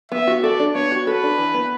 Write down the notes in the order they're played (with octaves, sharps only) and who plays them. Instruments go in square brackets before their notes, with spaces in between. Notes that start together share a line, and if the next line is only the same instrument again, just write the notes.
[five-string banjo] B3 [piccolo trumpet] E5
[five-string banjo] F#4
[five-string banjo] A4 [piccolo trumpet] D5
[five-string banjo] D4
[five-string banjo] B3 [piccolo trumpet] C#5
[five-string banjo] F#4
[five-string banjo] A4 [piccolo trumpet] B4
[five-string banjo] D4
E3
B3